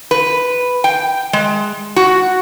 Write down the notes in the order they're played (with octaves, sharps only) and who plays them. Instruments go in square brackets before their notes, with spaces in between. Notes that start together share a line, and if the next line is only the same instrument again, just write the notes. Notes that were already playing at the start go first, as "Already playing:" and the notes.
[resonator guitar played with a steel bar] B4
G5
G#3
F#4